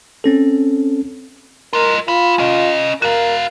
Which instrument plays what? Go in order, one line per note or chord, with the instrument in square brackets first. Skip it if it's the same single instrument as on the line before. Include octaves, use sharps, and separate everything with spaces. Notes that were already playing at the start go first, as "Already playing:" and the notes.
[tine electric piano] C4 C#4 A4
[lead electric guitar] F4 D#5 [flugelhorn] A#4
[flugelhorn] F4 [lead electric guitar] F5 B5
[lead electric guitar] C#4 D#5
[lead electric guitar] F#4 F5 [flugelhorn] A#4